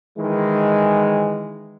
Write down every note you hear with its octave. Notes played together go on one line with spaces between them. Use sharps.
D#3 E3 G#3